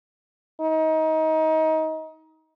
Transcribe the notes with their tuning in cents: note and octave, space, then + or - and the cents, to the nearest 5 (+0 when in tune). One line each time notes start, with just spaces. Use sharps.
D#4 +25